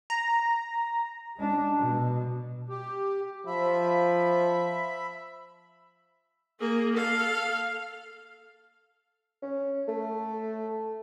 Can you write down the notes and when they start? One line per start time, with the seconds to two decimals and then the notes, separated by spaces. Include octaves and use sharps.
0.10 A#5
1.37 G#3 D4
1.79 B2
2.69 G4
3.47 F3 E5 B5
6.60 A#3 G#4
6.93 A4 F5
9.42 C#4
9.88 A3